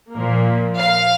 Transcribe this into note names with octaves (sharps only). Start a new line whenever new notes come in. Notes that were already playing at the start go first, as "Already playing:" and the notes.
A#2 F3 A#3
F5